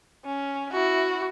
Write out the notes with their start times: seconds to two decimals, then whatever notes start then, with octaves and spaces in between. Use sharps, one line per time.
0.25 C#4
0.73 E4 F#4